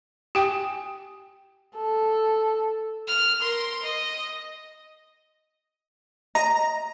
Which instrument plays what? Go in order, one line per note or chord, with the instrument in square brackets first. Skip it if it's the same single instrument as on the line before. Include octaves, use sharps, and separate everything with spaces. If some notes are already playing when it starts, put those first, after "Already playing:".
[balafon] G4 G5 G#5
[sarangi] A4
[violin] F6
A#4 C6
D#5
[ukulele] D#5 [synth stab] A#5